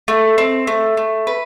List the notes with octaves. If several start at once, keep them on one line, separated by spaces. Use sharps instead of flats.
A3
C4
A3
A3
B4